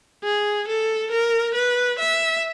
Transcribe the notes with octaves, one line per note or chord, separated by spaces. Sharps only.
G#4
A4
A#4
B4
E5